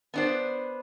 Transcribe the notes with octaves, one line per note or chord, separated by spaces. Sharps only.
B3 D4 C5